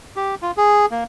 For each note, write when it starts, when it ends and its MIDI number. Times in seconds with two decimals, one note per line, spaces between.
0.16 0.35 67
0.42 0.51 65
0.57 0.86 68
0.91 1.04 58